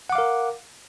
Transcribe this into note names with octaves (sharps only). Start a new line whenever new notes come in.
A#4 F5 F#5 D6